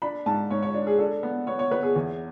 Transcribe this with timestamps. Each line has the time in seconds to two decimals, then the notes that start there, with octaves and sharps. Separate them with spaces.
0.02 D4 B5
0.26 G#2 A5
0.50 G#2 C#5
0.62 C#5
0.74 D4
0.87 G#4
0.99 D4 A4
1.23 B3
1.47 B3 C#5
1.59 C#5
1.71 B3 B4
1.83 G#4
1.96 E2